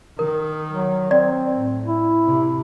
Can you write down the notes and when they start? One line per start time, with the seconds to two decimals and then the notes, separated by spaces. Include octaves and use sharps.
0.19 D#3 A#4
0.71 F#3
1.11 C4 D5
1.56 A2
1.85 E4
2.24 C3